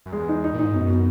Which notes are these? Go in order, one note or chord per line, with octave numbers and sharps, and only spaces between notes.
F#2
E2 G#3
D#4
D#4
A#2
D#4
G#2
F#2 B2
B2